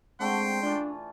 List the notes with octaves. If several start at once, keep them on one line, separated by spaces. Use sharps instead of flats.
D3 G#3 A3 C4 G5 C6
E3 D4 F4